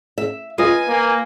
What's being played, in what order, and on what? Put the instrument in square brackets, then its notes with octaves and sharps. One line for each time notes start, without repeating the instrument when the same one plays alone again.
[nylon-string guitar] E5
[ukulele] F4 D#5 [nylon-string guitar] B4 [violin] G#5
[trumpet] A#3